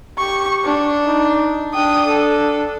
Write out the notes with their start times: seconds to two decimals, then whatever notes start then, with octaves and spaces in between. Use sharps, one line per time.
0.18 G4 C#6
0.65 D4
1.05 D#4
1.75 D4 G5 D#6
2.07 A4